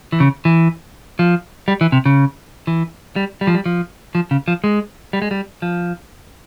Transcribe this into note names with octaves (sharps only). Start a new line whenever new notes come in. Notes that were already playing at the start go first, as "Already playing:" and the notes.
E3
C#3
E3
F3
G3
E3
C3
C#3
E3
G3
G3
F3
G3
F3
F3
C#3
F3
G#3
G3
G#3
G3
F3